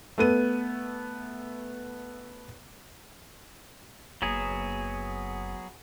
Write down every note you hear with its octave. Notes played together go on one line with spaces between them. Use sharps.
A3 B3 D#7
F#1 F#3 A#3 B3 G#4